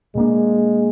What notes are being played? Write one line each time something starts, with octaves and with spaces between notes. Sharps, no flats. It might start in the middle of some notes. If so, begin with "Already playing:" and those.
B2 G#3 A#3 D4